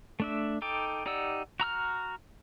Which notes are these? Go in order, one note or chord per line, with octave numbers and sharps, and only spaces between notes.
A3 D4 E5
D#4 A4 G5 D6
D#4 G4 D5 F#5 E6
F#4 A#5 E6 F6